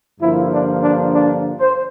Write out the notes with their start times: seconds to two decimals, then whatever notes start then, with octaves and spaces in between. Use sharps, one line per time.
0.20 G2 D3 F3 A#3 E4
0.52 D4
0.83 D4
1.14 D4
1.60 C5